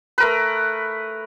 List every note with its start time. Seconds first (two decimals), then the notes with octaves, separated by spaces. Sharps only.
0.18 A3 A#4 B4